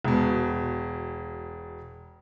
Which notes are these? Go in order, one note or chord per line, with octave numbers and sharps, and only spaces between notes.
E1 B2